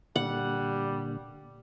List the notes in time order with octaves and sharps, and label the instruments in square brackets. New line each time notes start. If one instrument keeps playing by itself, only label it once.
[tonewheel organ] A#2 D3 [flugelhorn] G3 [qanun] F#5